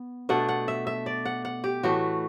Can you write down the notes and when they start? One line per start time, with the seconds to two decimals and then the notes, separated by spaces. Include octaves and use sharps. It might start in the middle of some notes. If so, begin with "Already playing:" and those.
Already playing: B3
0.29 B2 A3 D4 F#5
0.49 F#5
0.68 E5
0.87 E5
1.06 D5
1.25 F#5
1.45 F#5
1.64 G4
1.83 A2 E3 A3 F#4